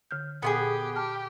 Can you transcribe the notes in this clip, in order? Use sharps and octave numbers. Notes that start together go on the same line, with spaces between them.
D3 F6 G6
A#2 B3 F4 G4 G#4
G4 A5 F6